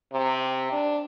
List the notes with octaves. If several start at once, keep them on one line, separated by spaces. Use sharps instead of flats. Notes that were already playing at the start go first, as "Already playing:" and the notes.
C3
D4